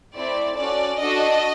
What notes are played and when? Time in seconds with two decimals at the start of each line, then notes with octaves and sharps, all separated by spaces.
0.14 A3 C4 E4 D5
0.57 C#4 F#4 A4 D5
1.00 D4 F#4 A4 D#5